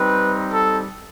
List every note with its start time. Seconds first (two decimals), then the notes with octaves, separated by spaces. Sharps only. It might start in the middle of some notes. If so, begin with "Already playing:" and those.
Already playing: G3 C4 D#4 B4
0.53 A4